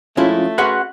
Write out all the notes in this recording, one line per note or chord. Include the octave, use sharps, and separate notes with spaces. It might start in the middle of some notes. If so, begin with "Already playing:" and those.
F2 G#3 A3 C#4 E4 F4
C#4 F#4 G#4 B4 D#5 C6 F#6